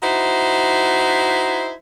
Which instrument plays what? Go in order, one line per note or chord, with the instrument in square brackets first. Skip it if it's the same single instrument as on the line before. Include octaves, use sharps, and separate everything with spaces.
[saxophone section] D#4 E4 F#4 C5